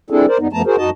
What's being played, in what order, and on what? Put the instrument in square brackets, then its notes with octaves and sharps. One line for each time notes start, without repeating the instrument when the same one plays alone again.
[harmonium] G3 C4 D4 E4 G#4 A4
A#4 C5 D5
F#2 G3 B3 D#4
F#2 F3 A3 B3 A5 A#5
F#4 G#4 A#4 C5
F#2 D#4 F#4 D#5 A5